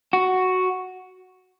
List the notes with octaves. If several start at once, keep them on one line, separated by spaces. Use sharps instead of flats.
F#4